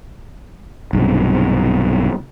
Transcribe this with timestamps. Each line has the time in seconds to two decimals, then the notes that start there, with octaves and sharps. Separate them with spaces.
0.93 B1 G2 C3